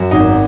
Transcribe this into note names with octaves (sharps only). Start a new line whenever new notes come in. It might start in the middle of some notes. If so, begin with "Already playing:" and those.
Already playing: F#2 F#4
G#1 D#4